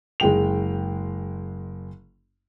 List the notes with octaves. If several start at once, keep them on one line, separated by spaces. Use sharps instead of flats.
F#1 G#3 G5 F7